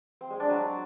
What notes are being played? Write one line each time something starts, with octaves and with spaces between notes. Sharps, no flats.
C4
G#3
D4
F#3